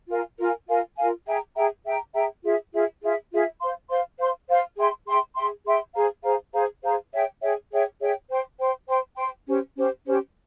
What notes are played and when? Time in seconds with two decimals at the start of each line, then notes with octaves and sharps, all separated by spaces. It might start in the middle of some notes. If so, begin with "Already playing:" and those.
0.09 F4 A#4 F5 G#5
0.38 F4 A#4 F5 G#5
0.67 F4 A#4 F5 G#5
0.97 F4 A#4 F5 G#5
1.26 G#4 E5 G5 A#5
1.55 G#4 E5 G5 A#5
1.84 G#4 E5 G5 A#5
2.14 G#4 E5 G5 A#5
2.43 F4 G#4 E5
2.73 F4 G#4 E5
3.02 F4 G#4 E5
3.32 F4 G#4 E5
3.60 C5 F5 C6
3.90 C5 F5 C6
4.19 C5 F5 C6
4.48 C5 F5 C6
4.78 G#4 E5 G5 C6
5.07 G#4 E5 G5 C6
5.36 G#4 E5 G5 C6
5.66 G#4 E5 G5 C6
5.95 G#4 C5 F5 A#5
6.24 G#4 C5 F5 A#5
6.53 G#4 C5 F5 A#5
6.83 G#4 C5 F5 A#5
7.12 G#4 C#5 E5 G5
7.42 G#4 C#5 E5 G5
7.71 G#4 C#5 E5 G5
8.00 G#4 C#5 E5 G5
8.29 C5 G5 C6
8.59 C5 G5 C6
8.88 C5 G5 C6
9.17 C5 G5 C6
9.47 C#4 G4 C5
9.76 C#4 G4 C5
10.06 C#4 G4 C5